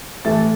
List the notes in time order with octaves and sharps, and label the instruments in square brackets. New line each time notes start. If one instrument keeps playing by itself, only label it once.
[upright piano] A2 E3 A3 A6